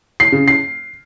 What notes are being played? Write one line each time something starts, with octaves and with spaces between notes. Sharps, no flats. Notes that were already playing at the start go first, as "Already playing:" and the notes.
C7
C#3
C7